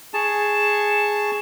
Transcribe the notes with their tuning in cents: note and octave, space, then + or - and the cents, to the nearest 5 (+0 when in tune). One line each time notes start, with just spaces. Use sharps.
G#4 +0 A5 +0 C#6 +0